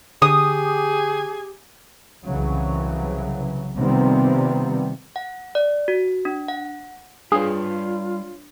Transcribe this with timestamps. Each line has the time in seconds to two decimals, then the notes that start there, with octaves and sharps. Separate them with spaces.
0.22 D3 G4 G#4 D#6
2.26 C2 C#3 E3 F#3
3.77 C3 D#3 F3 G3 B3 C4
5.16 F#5
5.55 D5
5.88 F#4
6.25 D4
6.48 F#5
7.32 G3 D4 F4 G#4 B4 C#5 F5